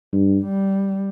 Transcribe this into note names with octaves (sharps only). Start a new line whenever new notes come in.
G2
G3